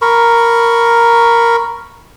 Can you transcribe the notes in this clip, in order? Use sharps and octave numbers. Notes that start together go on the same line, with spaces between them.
A#4 B5 C#6